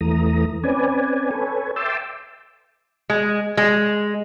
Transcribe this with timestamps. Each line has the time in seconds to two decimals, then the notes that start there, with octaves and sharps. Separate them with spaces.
0.01 E2 E3 A3 A#5 D#6
0.64 C4 C#4 B4 D5 G#5
1.31 A4 B4 C#5 G#5
1.76 E5 G5 A5 C6 D6 E6
3.10 G#3
3.57 G#3